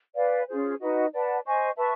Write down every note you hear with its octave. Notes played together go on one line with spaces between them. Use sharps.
B4 D5 F5 G#5
C#4 F4 G#4 C5
D#4 F#4 B4 D#5
B4 D5 F#5 A5
C5 D#5 G#5 C#6
B4 E5 A5 C#6